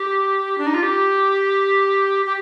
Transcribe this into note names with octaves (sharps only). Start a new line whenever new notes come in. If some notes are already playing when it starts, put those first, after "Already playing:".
Already playing: G4
D4
D#4
F4
G4
G4